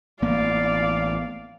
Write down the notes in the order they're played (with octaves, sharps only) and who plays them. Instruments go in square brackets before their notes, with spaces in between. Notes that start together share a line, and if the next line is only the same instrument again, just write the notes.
[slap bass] A1 A#3 B3 [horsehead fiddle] D5 F5